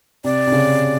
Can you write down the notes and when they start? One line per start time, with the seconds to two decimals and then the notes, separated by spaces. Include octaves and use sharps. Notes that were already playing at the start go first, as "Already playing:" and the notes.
0.24 C3 D5
0.47 C3
0.52 C#3